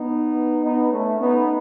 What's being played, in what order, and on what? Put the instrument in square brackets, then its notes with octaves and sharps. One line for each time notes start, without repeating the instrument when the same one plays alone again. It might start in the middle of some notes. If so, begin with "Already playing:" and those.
Already playing: [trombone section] B3 D#4
B3 D#4
A3 C#4
B3 D#4